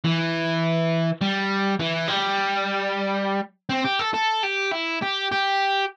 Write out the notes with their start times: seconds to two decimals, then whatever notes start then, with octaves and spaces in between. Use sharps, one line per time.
0.04 E3
1.21 G3
1.80 E3
2.09 G3
3.69 C4
3.84 G4
3.99 A4
4.14 A4
4.44 G4
4.72 E4
5.02 G4
5.32 G4